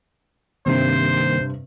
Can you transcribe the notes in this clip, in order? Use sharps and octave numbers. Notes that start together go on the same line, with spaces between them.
G2 C3 D#3 G3 A#3 C4 C5